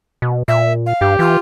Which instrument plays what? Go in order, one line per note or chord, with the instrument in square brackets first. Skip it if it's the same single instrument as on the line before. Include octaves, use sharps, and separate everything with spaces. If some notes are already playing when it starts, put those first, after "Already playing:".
[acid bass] B2
[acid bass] A#2 [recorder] E5
[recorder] F5
[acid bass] G2 [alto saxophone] G4
[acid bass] E3 [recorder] F4